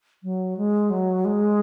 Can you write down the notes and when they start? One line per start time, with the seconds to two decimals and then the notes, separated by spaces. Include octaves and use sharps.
0.23 F#3
0.57 G#3
0.90 F#3
1.25 G#3